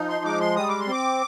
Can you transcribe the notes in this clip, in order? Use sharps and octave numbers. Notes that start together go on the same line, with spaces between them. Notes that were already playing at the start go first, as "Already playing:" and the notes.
Already playing: F3 D#4
C6
G#3 D6
C6
G3 D#6
D6
C6
C4 D6